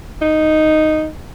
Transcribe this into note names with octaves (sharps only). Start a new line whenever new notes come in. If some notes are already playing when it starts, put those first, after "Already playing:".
D#4